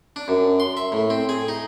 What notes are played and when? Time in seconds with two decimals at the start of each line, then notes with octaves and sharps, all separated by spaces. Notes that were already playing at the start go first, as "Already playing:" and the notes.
0.16 D4
0.28 F#2
0.60 C6
0.77 E5
0.92 A2
1.10 C4
1.29 G#4
1.48 D#4